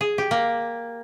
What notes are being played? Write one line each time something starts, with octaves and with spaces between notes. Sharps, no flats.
G#4
G4
A#3